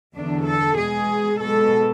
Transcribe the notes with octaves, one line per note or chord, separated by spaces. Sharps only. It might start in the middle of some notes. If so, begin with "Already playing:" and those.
E2 D3 F#3 D4
A4
B2 G#3 G#4
B2 G#3 A4